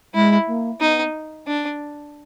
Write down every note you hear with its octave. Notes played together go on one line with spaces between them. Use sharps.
G#3 E4
A#3
B3 D#4
D4